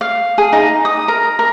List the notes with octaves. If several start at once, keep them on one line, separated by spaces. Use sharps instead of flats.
F5
G#4
D#4
D#6
A#4
A#4